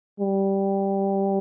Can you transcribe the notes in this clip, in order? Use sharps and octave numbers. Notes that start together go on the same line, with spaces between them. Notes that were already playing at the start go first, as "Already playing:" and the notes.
G3